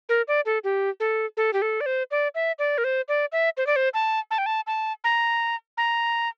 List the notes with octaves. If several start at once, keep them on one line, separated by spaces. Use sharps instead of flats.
A#4
D5
A4
G4
A4
A4
G4
A4
D5
C5
D5
E5
D5
A#4
C5
D5
E5
C5
D5
C5
A5
A5
G5
A5
A5
A#5
A#5